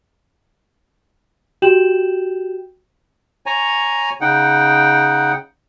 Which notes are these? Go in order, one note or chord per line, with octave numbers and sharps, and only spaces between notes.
F#4 G4 G5 G6 E7 F#7
C#5 G#5 A#5
C#3 D#4 F#5 G5